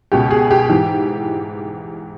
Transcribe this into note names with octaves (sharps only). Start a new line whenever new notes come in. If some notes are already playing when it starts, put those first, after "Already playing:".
C#2 B2 G4
G#4
G4
G#2 E3